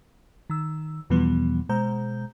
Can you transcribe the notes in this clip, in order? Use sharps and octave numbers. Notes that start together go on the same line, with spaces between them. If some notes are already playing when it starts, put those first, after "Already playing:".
D#3 E6
E2 B2 E3 F3 G3 B3
B2 G#3 C5 A#5 G6